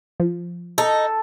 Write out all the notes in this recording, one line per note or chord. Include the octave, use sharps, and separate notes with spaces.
F3
D#4 A4